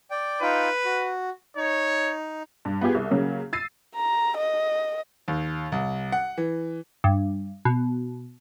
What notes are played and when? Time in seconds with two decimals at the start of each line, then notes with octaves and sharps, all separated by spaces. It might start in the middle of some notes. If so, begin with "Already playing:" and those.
0.11 D5 G5
0.41 D#4 F4 B4 G5
0.85 F#4
1.56 D#4 C#5
2.65 G2
2.81 B3 F4 G4 G#4
2.95 C2
3.11 C#3 F#3 A#3
3.53 E6 A6 C7 D#7
3.96 A#5
4.37 D#5
5.28 D#2
5.72 C2
6.12 F#5
6.38 E3
7.04 G2
7.65 B2